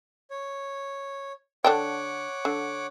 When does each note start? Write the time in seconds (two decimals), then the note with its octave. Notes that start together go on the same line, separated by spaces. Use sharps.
0.30 C#5
1.64 D3 D4 C#5 F#5 G5 D6
2.45 D3